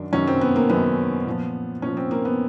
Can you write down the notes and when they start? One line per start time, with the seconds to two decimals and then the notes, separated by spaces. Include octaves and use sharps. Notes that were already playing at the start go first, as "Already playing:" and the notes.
Already playing: F#2 D#3 F#3 D4
0.13 F#2 D#3 F#3 C#4
0.27 C4
0.41 B3
0.56 A#3
0.69 F#2 D#3 F#3 B3
1.26 A#2 F3
1.82 A#2 F3 C#4
1.97 C4
2.11 A#3
2.25 B3